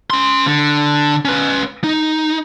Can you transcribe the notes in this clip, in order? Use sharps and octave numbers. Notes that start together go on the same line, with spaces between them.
C#4 C6
D3
C#4 B4
D#4